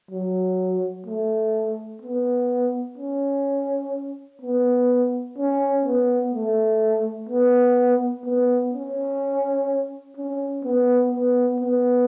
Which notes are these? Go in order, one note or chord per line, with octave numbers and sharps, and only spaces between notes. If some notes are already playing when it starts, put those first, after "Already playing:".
F#3
A3
B3
C#4
B3
C#4
B3
A3
B3
B3
C#4
C#4
B3
B3
B3